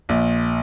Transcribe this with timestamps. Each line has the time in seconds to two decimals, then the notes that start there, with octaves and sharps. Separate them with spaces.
0.09 A#1